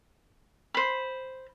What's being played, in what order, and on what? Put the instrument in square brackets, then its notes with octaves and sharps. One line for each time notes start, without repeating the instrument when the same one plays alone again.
[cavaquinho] C5 B5